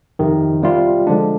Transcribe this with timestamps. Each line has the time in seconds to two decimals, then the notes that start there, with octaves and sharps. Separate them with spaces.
0.19 F2 C3 D#3
0.63 C3 G3 C4 F4
1.07 D3 F3 G#3 D4